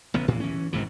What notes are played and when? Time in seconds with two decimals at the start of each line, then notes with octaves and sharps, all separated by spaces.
0.14 A1 C#3 B3
0.28 A2 E3
0.40 E3 C#4
0.73 G#1 G#2 C3 E3